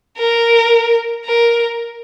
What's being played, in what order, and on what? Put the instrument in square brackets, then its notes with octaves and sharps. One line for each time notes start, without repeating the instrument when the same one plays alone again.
[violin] A#4
A#4